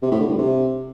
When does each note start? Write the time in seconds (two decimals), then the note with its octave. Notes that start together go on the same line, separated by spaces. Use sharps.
0.02 C3
0.11 A2
0.20 D3
0.29 G2
0.38 C3